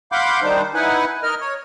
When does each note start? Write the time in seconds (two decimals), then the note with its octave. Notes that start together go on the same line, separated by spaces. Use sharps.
0.12 F5 F#5 B5 C6 D6 G6
0.43 D#3 G3 D4 D#4 C5
0.74 D#4 E4 B4 F#5 G#5
1.23 A#4 D#5 F6
1.41 C#5